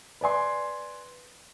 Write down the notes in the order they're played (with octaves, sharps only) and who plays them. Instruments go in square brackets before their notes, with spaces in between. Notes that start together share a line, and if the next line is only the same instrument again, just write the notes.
[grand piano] B4 D5 G#5 C6